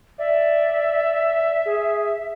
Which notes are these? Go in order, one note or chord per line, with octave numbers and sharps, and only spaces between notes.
D5 E5
G#4